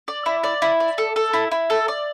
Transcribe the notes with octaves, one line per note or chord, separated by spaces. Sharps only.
D5
E4
D5
E4
D5
A4
A4
E4
E4
A4
D5